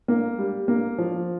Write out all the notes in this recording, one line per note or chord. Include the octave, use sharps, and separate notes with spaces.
A#3
G3
A#3
F3